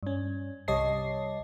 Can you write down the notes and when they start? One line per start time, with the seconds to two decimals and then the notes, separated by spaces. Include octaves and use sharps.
0.03 G2 C#4
0.68 C2 G3 C#5 D#5 A5 C7